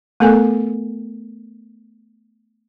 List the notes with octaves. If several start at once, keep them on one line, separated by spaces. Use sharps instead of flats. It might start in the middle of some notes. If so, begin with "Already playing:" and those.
A3 B3 A4 A#4 G#5